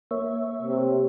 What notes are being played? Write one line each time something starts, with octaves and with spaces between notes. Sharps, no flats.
A#3 C#5 E5
C3